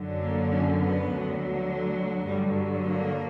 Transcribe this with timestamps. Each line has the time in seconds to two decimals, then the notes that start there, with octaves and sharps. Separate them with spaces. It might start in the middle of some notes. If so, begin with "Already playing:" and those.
Already playing: F#2 D3 F#3
0.21 A#3
0.51 C#4
0.79 B3
1.08 D2 D3 F#3
2.25 G2 D3 F#3 G3
2.85 A#3